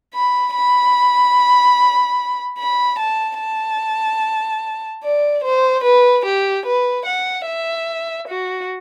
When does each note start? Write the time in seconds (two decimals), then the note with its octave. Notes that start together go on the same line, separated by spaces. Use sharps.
0.14 B5
0.55 B5
2.58 B5
2.99 A5
3.39 A5
5.03 D5
5.43 C5
5.84 B4
6.25 G4
6.65 B4
7.06 F#5
7.47 E5
8.28 F#4